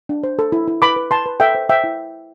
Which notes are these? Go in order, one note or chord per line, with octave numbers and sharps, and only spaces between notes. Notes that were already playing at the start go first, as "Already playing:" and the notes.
D4
C5
A4
E4
E4
B4 B5 D6
B4
B4 A5 C6
B4
A4 E5 G5
C5
C5 E5 G5
E4